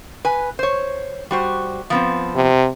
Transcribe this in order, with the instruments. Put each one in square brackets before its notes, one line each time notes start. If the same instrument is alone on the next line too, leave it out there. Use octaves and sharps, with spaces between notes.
[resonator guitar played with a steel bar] B4 G#5
C5 C#5
G3 F#4 C5
F3 B3 C4
[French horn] C3